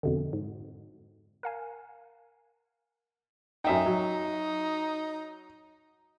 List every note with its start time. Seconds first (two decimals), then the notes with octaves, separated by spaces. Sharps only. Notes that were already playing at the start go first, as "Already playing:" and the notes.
0.03 F2 B2 D3
0.33 G#2
1.43 A#4 F5 G#5
3.64 F#2 D#4 E5 G5
3.86 F#3